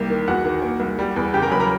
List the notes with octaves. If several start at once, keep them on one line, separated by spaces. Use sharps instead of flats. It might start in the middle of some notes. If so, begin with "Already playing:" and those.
Already playing: C2 A#3 G4
D#3
E2 F#4 F#5
D#3
A#3
C2
G3
E2
C#3 G4 G5
A#4 A#5
F#3 B4 B5
A#4 A#5